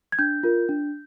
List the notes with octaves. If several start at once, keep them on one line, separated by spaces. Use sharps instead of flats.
G#6
D4 G6
F4 A#4
D4